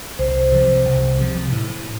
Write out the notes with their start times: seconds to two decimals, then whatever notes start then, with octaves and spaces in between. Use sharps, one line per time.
0.19 C2 C5
0.52 C3 F3
0.85 C2
1.19 C3 F3
1.52 A2